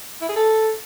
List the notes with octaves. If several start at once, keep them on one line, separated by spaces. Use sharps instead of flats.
E4
G#4
A4